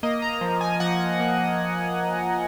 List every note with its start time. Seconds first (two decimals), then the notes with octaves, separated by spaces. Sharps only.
0.03 A#3 D#5
0.22 A#5
0.41 F3 A#5
0.61 G#5
0.80 F3 F#5
1.20 A#3